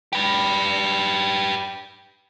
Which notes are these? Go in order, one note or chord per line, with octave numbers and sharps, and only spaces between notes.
G4 B4